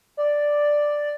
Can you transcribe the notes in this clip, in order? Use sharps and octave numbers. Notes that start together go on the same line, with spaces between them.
D5